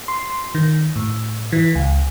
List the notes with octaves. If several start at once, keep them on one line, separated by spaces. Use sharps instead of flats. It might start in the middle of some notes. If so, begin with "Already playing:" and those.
C6
D#3
A2
E3
C#2